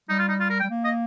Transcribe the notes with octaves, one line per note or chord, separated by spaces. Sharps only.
G3 D#4
F4
D#4
F4
A#4
G5
G3
A#3
D#5